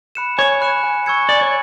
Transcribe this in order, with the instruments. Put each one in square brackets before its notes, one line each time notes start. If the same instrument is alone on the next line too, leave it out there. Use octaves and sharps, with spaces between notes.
[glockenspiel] B5 F#6 C#7 E7
[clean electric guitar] C#5 [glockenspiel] G#5
[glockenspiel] B5 F#6 C#7 E7
G#5
C#6 E6 G#6 C#7
[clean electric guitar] D5 [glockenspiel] G#5
[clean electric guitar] C#5